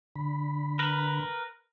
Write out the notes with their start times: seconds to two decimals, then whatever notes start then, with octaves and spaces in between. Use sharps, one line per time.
0.16 D3 B5
0.79 A#4 B4